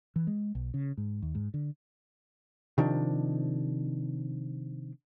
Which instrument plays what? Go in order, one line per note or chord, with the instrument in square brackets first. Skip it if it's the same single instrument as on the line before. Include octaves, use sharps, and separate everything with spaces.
[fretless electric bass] E3
G#3
B1
C#3
G#2
D#2
G#2
D3
[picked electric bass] C3 D#3 F3 D4